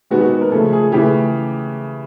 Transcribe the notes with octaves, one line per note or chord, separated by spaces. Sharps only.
C3 D#3 G#3 B3 F#4
F#4
B4
A#4
C#3 F3 A3 A4
G#4
C#3 E3 A3 G4